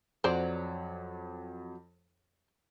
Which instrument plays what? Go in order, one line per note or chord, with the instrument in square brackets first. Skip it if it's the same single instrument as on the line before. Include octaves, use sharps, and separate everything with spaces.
[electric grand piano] F2 [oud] F#3 [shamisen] C5 D5